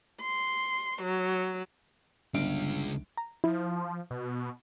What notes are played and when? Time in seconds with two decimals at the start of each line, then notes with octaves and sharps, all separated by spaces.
0.21 C6
1.02 F#3
2.34 G1 C#2 F5 D7
3.17 A#5
3.44 F3 E4
4.10 B2